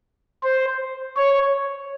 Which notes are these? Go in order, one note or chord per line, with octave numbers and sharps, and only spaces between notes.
C5
C#5